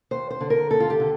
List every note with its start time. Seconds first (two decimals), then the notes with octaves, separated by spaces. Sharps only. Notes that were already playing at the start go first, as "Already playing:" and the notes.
0.11 D#2 C5
0.31 C5
0.41 D3
0.50 A#4
0.70 D#2 A4
0.80 F4
0.90 G4
1.00 D3